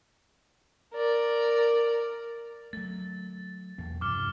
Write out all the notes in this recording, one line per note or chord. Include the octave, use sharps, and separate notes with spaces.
A#4 D5
F#3 A3 A6
B1 E2 A#3
G2 C3 F3 D6 F6